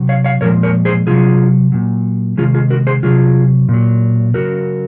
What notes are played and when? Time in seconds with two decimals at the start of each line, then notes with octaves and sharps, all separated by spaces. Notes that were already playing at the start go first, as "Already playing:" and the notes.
Already playing: C3 F#3
0.09 C#5 F5
0.24 C#5 F5
0.41 A#2 F3 G#3 A#4 C#5
0.63 A#4 C#5
0.85 G#4 C5
1.07 C3 F#3 F4 G#4
1.72 A#2 F#3
2.37 C3 D#3 G#3 F4 G#4
2.54 F4 G#4
2.70 F#4 A#4
2.87 G#4 C5
3.03 C3 F#3 F4 G#4
3.69 A#2 F#3
4.34 C#3 F#3 F#4 A#4